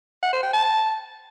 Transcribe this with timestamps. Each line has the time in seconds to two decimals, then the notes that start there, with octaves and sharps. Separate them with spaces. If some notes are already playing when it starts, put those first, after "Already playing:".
0.23 F#5
0.33 C5
0.43 G5
0.53 A5